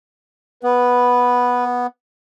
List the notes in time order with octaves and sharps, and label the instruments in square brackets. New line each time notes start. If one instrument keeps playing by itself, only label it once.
[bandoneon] B3 [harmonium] B4